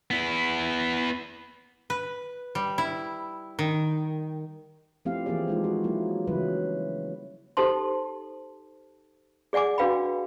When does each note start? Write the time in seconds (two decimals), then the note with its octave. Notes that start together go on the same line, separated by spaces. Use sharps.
0.11 B3 E4
1.90 B4
2.55 G3
2.78 E4
3.59 D#3
5.05 F3 A3 C4 E4 G4 F5
5.26 E3 F3 A#3 G4 G#4 D5
5.48 G#3 D#4 F4
5.64 F#4
5.84 F3 F#3 A#3 E4
6.27 C#3 E3 F#3 G3 E4 B4
7.57 D#4 G4 A4 C5 A5 C6
9.53 G#4 D5 F#5 G#5 D6
9.78 D4 F#4 B4 F5 G5 B5